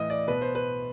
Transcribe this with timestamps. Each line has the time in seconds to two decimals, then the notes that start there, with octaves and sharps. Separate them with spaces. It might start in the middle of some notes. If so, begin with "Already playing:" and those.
Already playing: A2 E3 D#5
0.10 D5
0.28 B2 B4
0.41 C5
0.55 B4